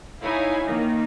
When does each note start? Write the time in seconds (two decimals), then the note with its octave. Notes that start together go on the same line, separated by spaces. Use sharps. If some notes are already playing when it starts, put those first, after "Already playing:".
0.22 D#4 E4 C#5 F5 G#5
0.65 D#3 A#3 D#4